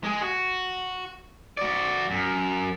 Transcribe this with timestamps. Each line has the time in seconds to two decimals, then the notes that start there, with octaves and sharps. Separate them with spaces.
0.04 G#3 G#4
0.22 F#4
1.57 F#4 D5
2.11 F#2